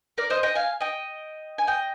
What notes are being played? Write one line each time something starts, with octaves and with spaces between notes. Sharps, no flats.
A#4 D5
C5 D#5
D#5 G5
F5 G#5
D#5 G5
G#5
D#5 G5